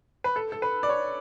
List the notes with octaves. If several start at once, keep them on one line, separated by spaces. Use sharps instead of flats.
B4
A4
A4
B4
D5
C#5